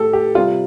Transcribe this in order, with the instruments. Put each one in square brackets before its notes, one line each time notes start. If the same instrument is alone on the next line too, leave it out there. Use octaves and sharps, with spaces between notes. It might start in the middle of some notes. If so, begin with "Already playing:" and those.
Already playing: [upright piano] A2 A3 G4 A4
G4
C3 G3 C4 F4